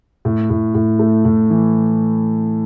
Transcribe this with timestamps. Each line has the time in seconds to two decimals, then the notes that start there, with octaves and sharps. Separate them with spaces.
0.25 A2
0.50 A2
0.75 A2
0.99 A3
1.25 A2
1.50 E3